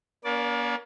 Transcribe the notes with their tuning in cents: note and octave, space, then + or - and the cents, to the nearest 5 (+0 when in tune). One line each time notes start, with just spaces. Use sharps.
A#3 +35 C#4 +45 D5 -10